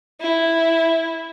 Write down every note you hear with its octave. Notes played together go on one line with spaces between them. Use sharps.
E4